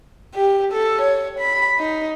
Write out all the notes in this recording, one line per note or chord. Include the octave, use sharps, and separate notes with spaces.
G4
A4
C#5
B5
D#4